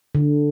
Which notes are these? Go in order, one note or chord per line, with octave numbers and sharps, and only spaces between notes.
D3